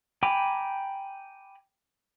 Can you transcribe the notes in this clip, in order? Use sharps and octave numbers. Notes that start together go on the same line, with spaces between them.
G5 G#5 A#5 B5 D6